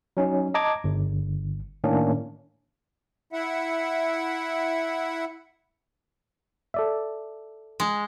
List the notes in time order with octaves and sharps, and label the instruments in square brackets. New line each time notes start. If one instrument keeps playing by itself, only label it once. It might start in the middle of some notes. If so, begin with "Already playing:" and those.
[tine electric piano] F#3 C#4 D#4
D#5 A5 A#5 D6 G#6
G1
A2 D#3 A#3 C#4 D4
[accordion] E4 E5 F#5
[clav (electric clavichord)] A4 D5 E5
[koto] G#3